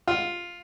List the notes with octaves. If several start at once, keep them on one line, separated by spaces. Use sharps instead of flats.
F4